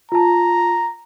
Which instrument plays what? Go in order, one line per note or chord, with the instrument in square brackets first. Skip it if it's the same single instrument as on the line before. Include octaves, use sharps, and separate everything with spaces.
[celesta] F4 A5 [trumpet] A#5